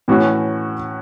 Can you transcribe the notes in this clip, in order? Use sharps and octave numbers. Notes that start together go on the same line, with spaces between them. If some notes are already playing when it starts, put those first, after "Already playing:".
A2 E3 C#4 F#4